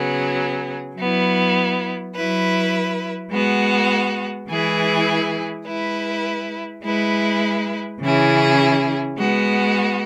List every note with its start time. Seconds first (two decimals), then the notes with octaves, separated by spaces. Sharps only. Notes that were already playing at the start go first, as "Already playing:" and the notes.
Already playing: C#3 F#3 B3 G#4
0.96 F#3 B3 E4
2.14 F#3 E4 B4
3.31 G#3 B3 F#4
4.49 E3 G#3 E4 G#4 B4
5.66 G#3 E4 B4
6.84 G#3 E4 B4
8.00 C#3 E3 C#4 E4 G#4
9.18 G#3 B3 F#4